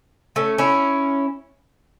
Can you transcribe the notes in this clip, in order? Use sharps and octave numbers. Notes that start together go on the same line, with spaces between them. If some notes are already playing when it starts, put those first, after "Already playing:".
A3 C#4
C#4 E4